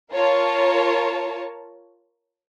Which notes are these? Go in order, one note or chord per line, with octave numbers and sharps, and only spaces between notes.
F4 A#4 C#5 A5